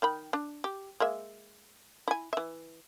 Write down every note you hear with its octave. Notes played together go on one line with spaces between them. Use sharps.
D#3 G5 B5
D4
G4
G#3 A#3 E5
E4 G#5
E3 E5